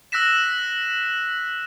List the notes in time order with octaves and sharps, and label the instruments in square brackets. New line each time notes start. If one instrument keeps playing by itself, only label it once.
[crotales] E6 F#6 A#6 B6 E7